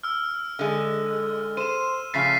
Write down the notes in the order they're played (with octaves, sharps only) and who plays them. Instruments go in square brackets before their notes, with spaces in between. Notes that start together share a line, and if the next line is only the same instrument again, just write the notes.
[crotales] E6 F6
[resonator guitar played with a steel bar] D3 G#3
[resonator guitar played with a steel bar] C5 [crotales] D#7 E7
[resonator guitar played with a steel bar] A2 C#3 F3 [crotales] A6 B6 C7